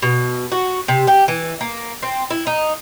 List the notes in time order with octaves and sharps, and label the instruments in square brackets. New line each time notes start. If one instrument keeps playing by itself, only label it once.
[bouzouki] B2
F#4
C3
G4
E3
A#3
C4
E4
D#4